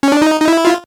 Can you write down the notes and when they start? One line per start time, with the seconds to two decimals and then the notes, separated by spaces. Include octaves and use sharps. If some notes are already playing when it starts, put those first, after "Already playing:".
0.03 C#4
0.12 D4
0.22 D#4
0.41 D#4
0.48 E4
0.65 F4